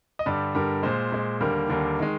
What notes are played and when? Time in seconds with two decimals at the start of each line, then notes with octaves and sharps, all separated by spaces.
0.19 D#5
0.26 G2 D3 G3 D5
0.55 G2 D3 G3 A#4
0.83 A#2 G#3 C5
1.12 A#2 G#3
1.40 D#2 D3 G3 A#3 A#4
1.69 D#2 D3 G3 A#3 A#4
2.00 D#3 G#3